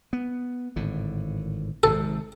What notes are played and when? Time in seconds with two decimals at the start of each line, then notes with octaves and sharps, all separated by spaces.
0.13 B3
0.76 G#1 A2 D3
1.83 G#1 G#2 C3 A4